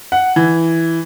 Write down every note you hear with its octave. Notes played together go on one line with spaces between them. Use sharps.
F#5
E3